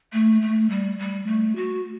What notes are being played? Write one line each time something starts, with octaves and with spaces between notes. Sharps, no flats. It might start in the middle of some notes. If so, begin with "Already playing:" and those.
A3
A3
G3
G3
A3
F#4